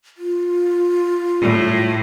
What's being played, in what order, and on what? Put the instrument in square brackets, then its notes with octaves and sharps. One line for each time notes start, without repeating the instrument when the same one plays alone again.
[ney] F4
[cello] A2